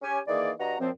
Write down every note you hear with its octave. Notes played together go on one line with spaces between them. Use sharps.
C#4 G4 G#5
D#3 E3 A#3 G#4 D5
G2 F#4 D#5 A#5
F#2 A#2 F3 C4